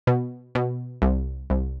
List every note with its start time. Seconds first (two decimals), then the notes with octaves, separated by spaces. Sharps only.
0.07 B2
0.55 B2
1.02 C2
1.50 C2